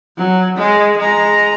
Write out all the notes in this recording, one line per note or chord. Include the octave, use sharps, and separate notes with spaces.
F#3
G#3
G#3 A#5